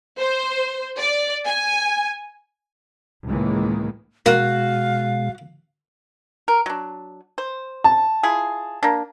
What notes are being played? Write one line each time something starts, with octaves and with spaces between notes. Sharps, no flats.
C5
D5
G#5
C#2 A2 D#3 E3 G#3 A#3
B2 G#3 A#3 F#4 F5
A#4
F#3 D4
C5
A5
E4 F4 G#4
A#3 D4